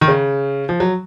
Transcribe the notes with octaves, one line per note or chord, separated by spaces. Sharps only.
D#3
C#3
F3
F#3